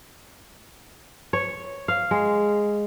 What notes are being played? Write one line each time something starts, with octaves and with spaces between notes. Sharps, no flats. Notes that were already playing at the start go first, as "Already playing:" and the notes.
C#5
F5
G#3